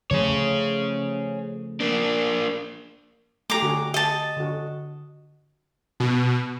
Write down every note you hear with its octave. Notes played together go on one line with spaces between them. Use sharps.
C#3 F3 A3 G#4 C#5
A#3 D4
A3 G4 A#5 D6
D3 F#4 G#4
G4 D#5 A5
D3 F#4
B2